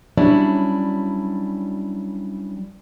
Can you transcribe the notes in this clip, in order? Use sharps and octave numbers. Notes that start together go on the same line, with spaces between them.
F#3 G3 C#4 D4 E4